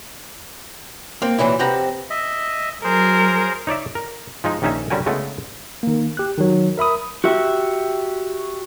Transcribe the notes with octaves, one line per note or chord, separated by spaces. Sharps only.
A#3 C4
A#2 E3 F#3 E4
F2 C3 C4 B4 F#5 A#5
D#5 E5
F#3 G#4 A#4 C5
D#4 C#5 D5 E5
A#4
F3 G#3 D#4
A#1 D#3 C#4 D#4 E5 G#5
D3 G3 C#4 F#4 A#4 G#5
C#3 G#3 A3 B3
D#3 A#3
G4 F#6
D#3 F#3
A#4 E5 B5 D#6
F#4 G4 E5